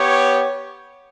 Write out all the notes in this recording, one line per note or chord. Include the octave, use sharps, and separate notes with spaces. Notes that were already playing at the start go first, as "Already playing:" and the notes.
Already playing: B3 G4 C#5